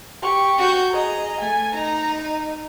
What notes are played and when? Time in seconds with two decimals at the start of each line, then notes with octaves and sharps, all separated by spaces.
0.22 G4 C#6
0.58 F#4 G6
0.92 G#4 D#5 A#5
1.40 A3 G#5
1.74 D#4 A#5